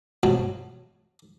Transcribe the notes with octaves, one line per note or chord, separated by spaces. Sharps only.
G2 B2 F3 F#3